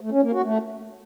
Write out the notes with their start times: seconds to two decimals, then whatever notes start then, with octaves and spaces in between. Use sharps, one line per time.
0.01 A3
0.12 C#4
0.22 A#3
0.33 F#4
0.44 A3